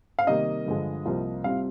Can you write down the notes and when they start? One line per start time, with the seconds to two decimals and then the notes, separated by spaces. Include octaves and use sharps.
0.19 F5
0.27 C3 D#3 G3 A#3 D#5
0.66 G2 D3 F3 G#3
1.05 C2 C3 F3 A#3 F4
1.44 C2 C3 G3 C4 F4 F5